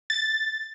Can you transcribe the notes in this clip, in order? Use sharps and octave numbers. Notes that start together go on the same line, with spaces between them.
A6